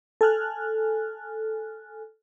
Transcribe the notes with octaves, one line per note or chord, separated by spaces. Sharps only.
A4 G#5 F6 F#6